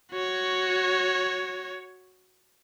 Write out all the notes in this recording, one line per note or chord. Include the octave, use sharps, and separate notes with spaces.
F#4 C#5